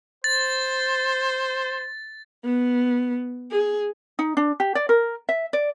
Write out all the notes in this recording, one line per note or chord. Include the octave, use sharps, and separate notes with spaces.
C5 A6
B3
G#4
D#4
D4
G4
D5
A#4
E5
D5